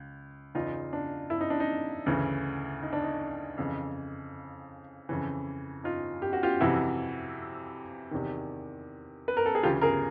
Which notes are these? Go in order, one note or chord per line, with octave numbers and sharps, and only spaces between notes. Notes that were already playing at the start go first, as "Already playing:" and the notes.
Already playing: C#2
E2 C#3 E3 D#4 F4
D4
E4
D#4
D4
D#4
D2 C#3 E3
D#4
D4
D#4
F2 C#3 E3
F2 C#3 E3
D#4 F4
G4
F#4
F4 G4
F2 C3 E3 E4 F#4
E2 C3 D#3
B4
A#4
A4
G#4
D2 C#3 E3 F4 G4
G#4 A#4